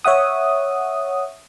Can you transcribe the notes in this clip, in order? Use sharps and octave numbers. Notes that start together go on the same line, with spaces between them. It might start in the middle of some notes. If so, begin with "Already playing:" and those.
C#5 E5 F#5 D#6